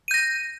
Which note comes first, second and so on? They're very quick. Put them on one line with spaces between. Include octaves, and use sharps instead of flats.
D#7 G6 A#6